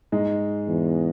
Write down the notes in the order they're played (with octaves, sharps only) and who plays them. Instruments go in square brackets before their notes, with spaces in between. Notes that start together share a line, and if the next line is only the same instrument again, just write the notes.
[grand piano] G#2 G#3
[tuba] E2